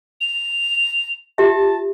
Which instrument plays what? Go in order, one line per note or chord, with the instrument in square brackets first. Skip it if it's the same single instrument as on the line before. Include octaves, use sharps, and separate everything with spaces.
[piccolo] F7
[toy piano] F4 G4 E5 [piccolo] A5